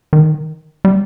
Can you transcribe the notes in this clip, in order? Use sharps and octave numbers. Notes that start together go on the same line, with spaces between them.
D#3
G3